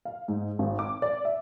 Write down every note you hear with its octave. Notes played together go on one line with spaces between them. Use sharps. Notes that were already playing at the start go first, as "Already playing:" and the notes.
F5
G#2
G#1
D6
D5
E5